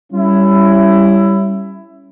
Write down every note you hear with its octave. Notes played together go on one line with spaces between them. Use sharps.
G3 C#4 E4